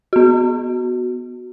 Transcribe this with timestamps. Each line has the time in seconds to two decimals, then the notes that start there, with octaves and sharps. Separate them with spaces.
0.13 B3 F#4